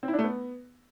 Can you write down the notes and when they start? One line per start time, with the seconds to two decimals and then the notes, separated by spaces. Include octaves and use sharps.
0.03 C4
0.08 E4
0.13 D4
0.19 A3
0.24 B3